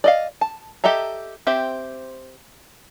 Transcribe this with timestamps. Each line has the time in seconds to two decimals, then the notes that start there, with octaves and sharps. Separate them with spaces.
0.04 D5 D#5 F5
0.41 A5
0.84 G4 A4 D#5 E5 A#5
1.47 C4 G4 C5 E5